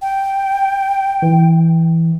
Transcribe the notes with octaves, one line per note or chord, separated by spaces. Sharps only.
G5
E3